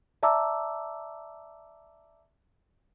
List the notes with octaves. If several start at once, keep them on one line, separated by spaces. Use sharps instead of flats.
D5 E5 A5 A#5 D6 E6